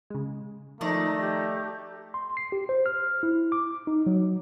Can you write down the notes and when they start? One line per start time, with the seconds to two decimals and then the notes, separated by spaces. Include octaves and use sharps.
0.10 C#3 G#3
0.81 D#3 F3 A3 D#4 D5 A#5
1.20 G4
2.14 C6
2.37 C7
2.52 G4
2.69 C5
2.86 F6
3.23 E4
3.52 D6
3.87 D#4
4.07 F#3